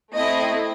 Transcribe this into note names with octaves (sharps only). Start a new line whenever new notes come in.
A3 C4 E4 D#5